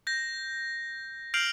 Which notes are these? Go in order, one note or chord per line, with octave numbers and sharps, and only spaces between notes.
G6 A#6
F6 G6 C7 D7 F7 F#7